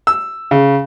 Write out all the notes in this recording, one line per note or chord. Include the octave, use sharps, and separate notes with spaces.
E6
C#3